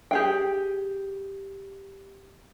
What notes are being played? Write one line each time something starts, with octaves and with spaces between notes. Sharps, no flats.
G4 G#4 G5